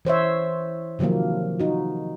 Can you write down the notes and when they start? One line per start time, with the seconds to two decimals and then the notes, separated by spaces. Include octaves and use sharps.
0.05 E3 C5 C#5 E5
0.99 C3 D#3 F3 F#3 A#3
1.60 D#4 F#4